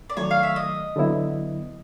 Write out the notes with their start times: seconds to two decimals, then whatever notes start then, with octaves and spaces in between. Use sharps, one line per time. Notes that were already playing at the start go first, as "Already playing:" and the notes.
0.10 D5
0.17 D#3 F#3 A3 C#5
0.31 F5
0.43 E5
0.56 D#5
0.96 D3 F#3 B3 E4